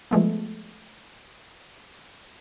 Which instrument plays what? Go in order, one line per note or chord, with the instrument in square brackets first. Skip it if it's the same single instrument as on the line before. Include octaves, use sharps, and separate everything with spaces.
[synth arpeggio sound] F3 G#3 A3 B3